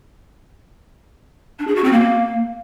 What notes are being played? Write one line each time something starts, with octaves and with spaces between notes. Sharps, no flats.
D4
G#4
F#4
C4
A#3